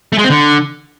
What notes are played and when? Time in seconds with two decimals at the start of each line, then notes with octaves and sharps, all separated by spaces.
0.13 A3
0.18 G#3
0.24 C4
0.30 D3